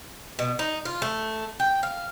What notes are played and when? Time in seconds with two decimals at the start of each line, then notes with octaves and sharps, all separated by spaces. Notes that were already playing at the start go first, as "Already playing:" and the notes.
0.39 B2
0.59 D#4
0.85 F4
1.02 A3
1.60 G5
1.83 F5